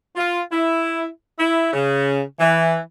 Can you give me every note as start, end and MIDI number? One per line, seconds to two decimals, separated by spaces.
0.16 0.41 65
0.52 1.06 64
1.38 1.72 64
1.73 2.21 49
2.39 2.77 52